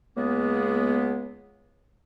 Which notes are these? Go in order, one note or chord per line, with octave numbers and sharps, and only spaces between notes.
C#2 C#3 G#3 A#3 B3